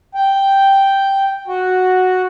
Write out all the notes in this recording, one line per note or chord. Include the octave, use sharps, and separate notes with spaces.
G5
F#4